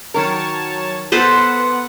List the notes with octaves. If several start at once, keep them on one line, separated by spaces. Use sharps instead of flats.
D#3 F#3 A#4 C#5 A5
B3 A4 B4 C5 F#5